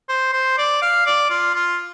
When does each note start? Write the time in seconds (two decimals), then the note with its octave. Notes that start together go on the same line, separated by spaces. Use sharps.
0.09 C5
0.33 C5
0.58 D5
0.82 F5
1.06 D5
1.30 F4
1.55 F4